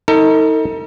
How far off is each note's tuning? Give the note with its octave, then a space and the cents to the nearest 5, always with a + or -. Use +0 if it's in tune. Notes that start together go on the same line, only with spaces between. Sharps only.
D#4 +35 A4 +45